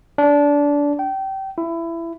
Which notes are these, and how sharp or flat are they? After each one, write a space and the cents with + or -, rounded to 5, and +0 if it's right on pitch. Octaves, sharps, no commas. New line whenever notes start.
D4 -20
G5 -25
E4 +20